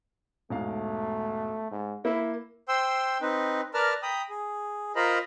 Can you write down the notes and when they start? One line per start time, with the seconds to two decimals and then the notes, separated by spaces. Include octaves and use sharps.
0.50 E1 G#2 A3 F5
1.71 G#2
2.05 A#3 E4
2.68 C5 G5 C6 E6
3.21 C4 D#4 B4
3.74 A#4 B4 D5 A5 A#5 F6
4.03 G5 A#5 B5 D#6
4.30 G#4
4.96 F4 A#4 C5 D#5 A#5 B5